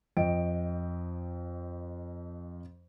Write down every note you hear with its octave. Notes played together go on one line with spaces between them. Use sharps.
F2 D#5 G5 D7